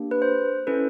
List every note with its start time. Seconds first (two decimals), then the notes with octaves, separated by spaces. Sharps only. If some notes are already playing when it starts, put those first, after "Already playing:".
Already playing: A#3 D4 G4
0.11 B4
0.22 C5
0.67 C#4 E4 A4 B4